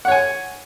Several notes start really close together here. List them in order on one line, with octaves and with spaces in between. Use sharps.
F#5 C#5 G#5